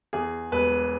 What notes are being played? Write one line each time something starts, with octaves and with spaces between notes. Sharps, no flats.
E2 G#4
E1 B4